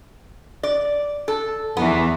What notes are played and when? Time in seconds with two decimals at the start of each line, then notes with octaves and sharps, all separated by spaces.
0.63 D5
1.28 A4
1.77 E2 E3 B3